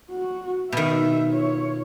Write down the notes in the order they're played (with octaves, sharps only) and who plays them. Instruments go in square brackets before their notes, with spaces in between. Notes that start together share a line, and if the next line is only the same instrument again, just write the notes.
[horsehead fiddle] F#4
[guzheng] B2 D#3 [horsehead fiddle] E5
[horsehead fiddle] F4 C#5